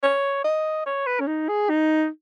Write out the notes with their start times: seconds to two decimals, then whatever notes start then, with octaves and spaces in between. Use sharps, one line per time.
0.03 C#5
0.44 D#5
0.86 C#5
1.06 B4
1.20 C#4
1.27 D#4
1.48 G#4
1.69 D#4